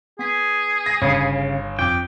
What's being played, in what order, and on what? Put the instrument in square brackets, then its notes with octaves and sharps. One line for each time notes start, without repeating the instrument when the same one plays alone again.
[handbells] B3 B6 [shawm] G#4
[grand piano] A#6
[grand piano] G1 [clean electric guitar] C#3 [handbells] C#5 F5
[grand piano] F2 [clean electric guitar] G5 [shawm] D6